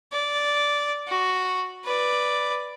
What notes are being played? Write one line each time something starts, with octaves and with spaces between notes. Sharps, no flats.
D5
F#4
B4 D5